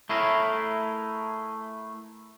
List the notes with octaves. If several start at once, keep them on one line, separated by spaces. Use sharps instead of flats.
A3 E4 G#4 A#4